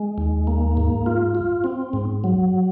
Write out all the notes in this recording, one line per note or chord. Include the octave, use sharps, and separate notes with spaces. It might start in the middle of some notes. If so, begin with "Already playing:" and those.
Already playing: G#3
D#2
A#3
G#2
F4
F4
C4
G#2
F#3